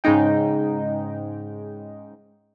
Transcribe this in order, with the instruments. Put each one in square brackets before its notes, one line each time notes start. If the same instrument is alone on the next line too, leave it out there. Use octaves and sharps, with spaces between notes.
[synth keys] G#2 C#3 G#3 D#4 G5